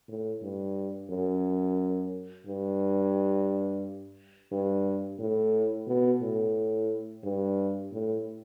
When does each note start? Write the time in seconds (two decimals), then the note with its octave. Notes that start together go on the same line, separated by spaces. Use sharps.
0.08 A2
0.42 G2
1.10 F#2
2.46 G2
4.52 G2
5.19 A2
5.87 B2
6.21 A2
7.24 G2
7.92 A2